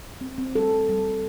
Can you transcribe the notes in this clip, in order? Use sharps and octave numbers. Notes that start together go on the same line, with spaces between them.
C4
C4
G3 A4
C4
G3
G3